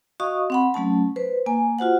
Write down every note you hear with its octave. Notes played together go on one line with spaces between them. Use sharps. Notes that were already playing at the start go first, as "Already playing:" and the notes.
F#4 D#5 F5 C#6 D#6
C4 F#5 B5
F#3 A3 C#4 A5
B4 C5
A#3 G#5
F4 F#4 C5 F#5